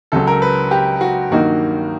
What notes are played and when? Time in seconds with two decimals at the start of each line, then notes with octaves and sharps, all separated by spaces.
0.12 C#2 C#3 F#3 A4
0.27 A#4
0.42 B4
0.71 G4
1.01 F#4
1.31 G2 D#3 F#3 A#3 D#4 F#4